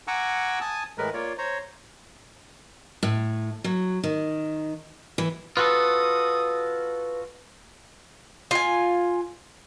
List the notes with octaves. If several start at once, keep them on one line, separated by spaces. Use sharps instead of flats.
F#5 G#5 A#5 C#6 D6 E6
G#5 A5 D#6
A2 E3 G#3 A#4 B4
A#3 F4 C#5 D5
C5 C#5 A#5
A2
F#3
D#3
E3
F4 F#4 A4 B4 D#6
F4 G#5